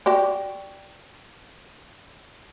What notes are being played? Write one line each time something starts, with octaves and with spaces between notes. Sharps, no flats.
F#4 G4 D5